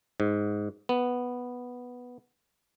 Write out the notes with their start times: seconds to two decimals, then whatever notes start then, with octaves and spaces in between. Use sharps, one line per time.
0.20 G#2
0.89 B3